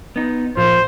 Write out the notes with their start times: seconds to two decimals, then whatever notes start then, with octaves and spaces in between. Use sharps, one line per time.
0.16 B3 D#4
0.57 A#2 F3 F4 C5